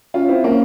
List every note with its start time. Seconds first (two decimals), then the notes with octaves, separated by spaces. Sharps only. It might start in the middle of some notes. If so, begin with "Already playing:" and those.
0.14 C#4 F4
0.29 C4 E4
0.44 A#3 C#4